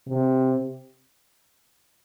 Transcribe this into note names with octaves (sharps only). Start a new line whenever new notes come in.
C3